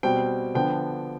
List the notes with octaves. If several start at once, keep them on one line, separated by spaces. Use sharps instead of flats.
B2 G3 C4 G5
D3 F3 B3 G5